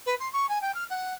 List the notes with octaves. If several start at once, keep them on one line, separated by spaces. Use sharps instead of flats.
B4
C6
C#6
G#5
G5
F6
F#5